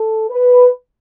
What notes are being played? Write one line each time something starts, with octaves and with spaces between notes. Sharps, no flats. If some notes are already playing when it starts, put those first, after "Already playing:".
Already playing: A4
B4